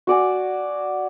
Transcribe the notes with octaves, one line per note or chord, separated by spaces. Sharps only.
F#4 D5 G#5